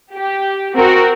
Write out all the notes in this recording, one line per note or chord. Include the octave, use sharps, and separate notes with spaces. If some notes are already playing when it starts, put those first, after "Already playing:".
G4
C4 F#4 A#4